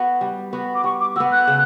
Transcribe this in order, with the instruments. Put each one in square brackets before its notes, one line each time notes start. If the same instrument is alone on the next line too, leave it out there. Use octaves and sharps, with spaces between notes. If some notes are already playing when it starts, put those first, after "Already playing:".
Already playing: [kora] B3 F#4
G3
B3 F#4
[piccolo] D6
[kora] G3 [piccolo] C#6
[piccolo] D6
[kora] F#4 [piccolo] E6
[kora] B3
[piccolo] F#6
[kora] C#3